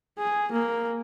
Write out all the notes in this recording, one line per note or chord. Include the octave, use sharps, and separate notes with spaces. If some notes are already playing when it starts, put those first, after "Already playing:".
G#4
A#3